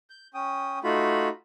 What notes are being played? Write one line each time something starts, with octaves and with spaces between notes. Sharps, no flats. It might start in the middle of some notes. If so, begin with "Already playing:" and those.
G6
C#4 G5 D#6
A3 D#4 F4 F#4 B5